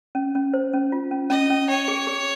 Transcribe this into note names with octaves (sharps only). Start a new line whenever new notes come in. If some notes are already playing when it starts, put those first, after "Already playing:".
C#4
C#4
C5
C#4
F4
C#4
C#4 D#5
C#4
C#5 G5
G#4
G#4